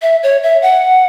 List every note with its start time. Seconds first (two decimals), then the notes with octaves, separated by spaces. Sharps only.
0.02 E5
0.23 C#5
0.43 E5
0.62 F#5